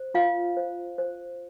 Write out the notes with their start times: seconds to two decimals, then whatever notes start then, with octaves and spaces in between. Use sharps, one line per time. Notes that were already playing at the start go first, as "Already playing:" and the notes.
Already playing: C5
0.14 F4 F5
0.57 C5
0.98 C5